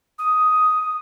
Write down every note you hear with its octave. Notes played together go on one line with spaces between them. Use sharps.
D#6